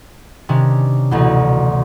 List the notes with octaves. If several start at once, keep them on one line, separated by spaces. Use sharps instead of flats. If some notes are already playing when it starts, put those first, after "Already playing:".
C3 D#3 C#4 D4
A1 D2 B2